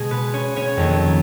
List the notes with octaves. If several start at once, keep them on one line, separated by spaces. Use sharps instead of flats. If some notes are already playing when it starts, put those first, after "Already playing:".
Already playing: B2 G#3 G#4
B3 B4
C#4 C#5
C#4 C#5
F2 D#3 F#3 A#3